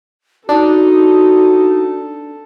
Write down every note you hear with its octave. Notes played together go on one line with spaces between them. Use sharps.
D4 D#4 F#4 A4